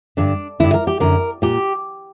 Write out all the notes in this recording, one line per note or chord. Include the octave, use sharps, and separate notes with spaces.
G2 D3 D4
G2 D3 E4
A#4
G4
F#2 D3 A#4
A#2 G4